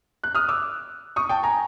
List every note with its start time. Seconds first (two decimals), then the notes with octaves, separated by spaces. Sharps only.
0.24 F#6
0.35 D#6 F6
0.49 D6 E6
1.16 C#6 D#6
1.29 G5 A5
1.43 G#5 A#5